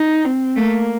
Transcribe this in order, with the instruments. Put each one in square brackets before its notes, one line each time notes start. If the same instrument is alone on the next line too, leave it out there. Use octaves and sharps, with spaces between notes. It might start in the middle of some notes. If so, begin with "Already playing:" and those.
Already playing: [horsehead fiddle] D#4
C4
[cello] A3 [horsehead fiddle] A#3